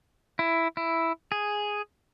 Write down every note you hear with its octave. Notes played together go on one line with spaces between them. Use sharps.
E4
E4
G#4